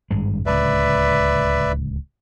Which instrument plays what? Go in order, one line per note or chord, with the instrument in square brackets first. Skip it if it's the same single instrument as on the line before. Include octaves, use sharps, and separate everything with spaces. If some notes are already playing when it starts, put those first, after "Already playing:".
[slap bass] G#1 G2 G#3
[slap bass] D1 C#2 [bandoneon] B4 D5 E5